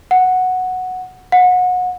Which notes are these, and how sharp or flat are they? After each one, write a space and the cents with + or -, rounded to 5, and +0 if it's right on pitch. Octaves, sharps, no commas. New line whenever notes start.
F#5 -5
F#5 -25